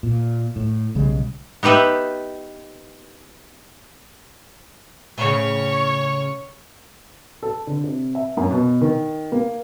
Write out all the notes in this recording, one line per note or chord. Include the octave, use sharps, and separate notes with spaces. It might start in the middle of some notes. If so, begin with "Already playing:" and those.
A#2
A2
B1 C#3 G3 G#3
B3 D#4 G4 B4 E5
A2 C#3 C#5
A4
D3
C3
E5
F#2
B2
D#3
A#3